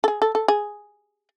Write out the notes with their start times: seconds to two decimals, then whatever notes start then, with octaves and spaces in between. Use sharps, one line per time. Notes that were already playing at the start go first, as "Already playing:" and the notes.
0.04 A4
0.08 G#4
0.22 A4
0.35 A4
0.48 G#4